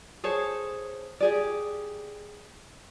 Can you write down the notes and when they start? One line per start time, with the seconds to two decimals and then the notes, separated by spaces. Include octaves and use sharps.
0.24 G#4 A4 C5 C#5
1.20 G4 G#4 D5